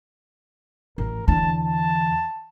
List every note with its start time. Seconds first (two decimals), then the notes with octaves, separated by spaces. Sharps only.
0.98 A1 A#4
1.28 E2 D3 A5
1.58 A5